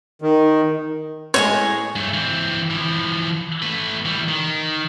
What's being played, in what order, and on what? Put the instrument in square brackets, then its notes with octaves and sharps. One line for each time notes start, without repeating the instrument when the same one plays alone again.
[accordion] D#3
[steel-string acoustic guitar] A2 G#3 G#4 [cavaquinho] C#5
[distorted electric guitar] G2 A3
E3 C4
E3 F3
A3 B4
E3 G3
D#3